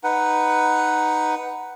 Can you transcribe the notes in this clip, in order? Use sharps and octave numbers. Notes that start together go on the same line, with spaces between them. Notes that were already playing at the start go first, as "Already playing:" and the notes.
D#4 B4 F#5